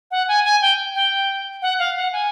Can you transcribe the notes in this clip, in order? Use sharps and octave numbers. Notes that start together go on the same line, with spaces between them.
F#5
G#5
G#5
G5
G5
F#5
F5
F#5
G#5